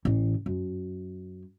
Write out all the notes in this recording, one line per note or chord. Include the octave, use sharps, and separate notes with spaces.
A1 E3
F#2